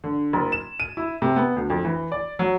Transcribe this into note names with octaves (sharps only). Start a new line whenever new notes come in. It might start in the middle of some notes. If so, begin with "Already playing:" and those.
D3
F#1
E7
D#7
E4
C3
B3
D2
F2
E3
D5
F#3